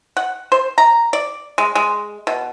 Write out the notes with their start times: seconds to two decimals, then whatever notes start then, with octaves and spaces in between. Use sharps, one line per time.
0.17 F#5
0.52 C5
0.78 A#5
1.13 D5
1.58 G#3
1.75 G#3
2.27 B2